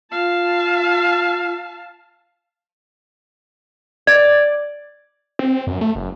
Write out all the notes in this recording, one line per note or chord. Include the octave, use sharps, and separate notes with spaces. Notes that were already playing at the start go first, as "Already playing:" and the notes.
F4 F5 A5
D5 G#6
C4
F#2
A3
F#1